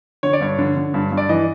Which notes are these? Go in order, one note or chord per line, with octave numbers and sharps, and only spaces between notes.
D3 C#5
D5
G2 C#5
D3
D3
G2
G2
D5
E3 D#5